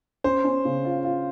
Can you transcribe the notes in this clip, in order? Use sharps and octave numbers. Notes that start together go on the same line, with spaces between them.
C#4 C5
C#4
C#3
F4
F4